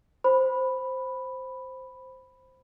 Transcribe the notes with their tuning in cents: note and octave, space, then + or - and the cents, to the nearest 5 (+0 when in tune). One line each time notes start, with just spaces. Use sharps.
C5 +0 B5 +0